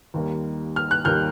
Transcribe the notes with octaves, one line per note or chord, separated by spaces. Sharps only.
D#2 D#3 G3 A#3
F6
F#6
D#2 D#3 G3 A#3 F6 G6